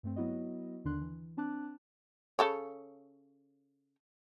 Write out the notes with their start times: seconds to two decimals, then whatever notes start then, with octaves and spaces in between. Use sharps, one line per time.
0.03 G2 A3 C4
0.16 F#3 B3 E4 F#4 D#5
0.84 D#2 D3 D#3 D4 C6 F#6
1.01 E3
1.37 C4 D4 A5 D6 F#6
2.39 C#3 A4 C#5